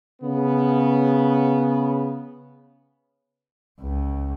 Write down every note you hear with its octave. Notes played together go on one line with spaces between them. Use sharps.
C#3 B3
C#2